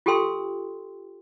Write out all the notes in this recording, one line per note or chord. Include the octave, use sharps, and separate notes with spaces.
F4 G4 A4 G5 C6 E6